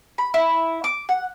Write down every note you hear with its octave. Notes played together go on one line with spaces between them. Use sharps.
B5
E4
D6
F#5